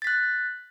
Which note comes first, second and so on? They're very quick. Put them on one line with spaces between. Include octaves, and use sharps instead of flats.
A6 B6 F#6